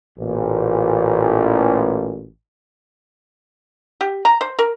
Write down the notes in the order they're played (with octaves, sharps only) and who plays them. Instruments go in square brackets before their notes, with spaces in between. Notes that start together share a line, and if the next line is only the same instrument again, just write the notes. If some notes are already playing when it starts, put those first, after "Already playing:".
[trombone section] A1 A#2
[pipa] G4
A#5
C5
A#4